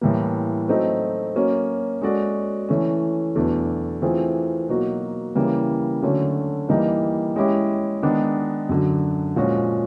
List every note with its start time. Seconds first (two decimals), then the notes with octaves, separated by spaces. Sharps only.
0.01 A2 E3 G3 A#3
0.68 F#3 A3 C4 D#4
1.35 F#3 A#3 C#4
2.02 G#3 C#4 F#4 A4 D5
2.69 E3 A3 C#4
3.35 E2 B2 F#3 A3 D4
4.02 E3 A3 C4 F4 G#4
4.69 B2 F#3 A#3 D#4 F#4
5.35 C#3 E3 G3 A#3
6.02 D3 F#3 A3 C#4
6.69 E3 G3 A#3 D#4
7.36 G#3 C#4 E4 G4
8.03 D#3 G#3 B3 D4
8.69 F#2 D3 F#3
9.36 A#2 F3 G#3 C#4 F#4